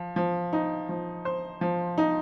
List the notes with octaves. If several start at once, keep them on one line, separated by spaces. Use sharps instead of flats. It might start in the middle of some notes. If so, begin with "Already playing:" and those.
Already playing: F3
F3
D#4
F3
C5
F3
D#4